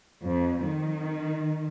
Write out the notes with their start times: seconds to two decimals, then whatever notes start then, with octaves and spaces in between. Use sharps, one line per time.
0.24 F2
0.68 D#3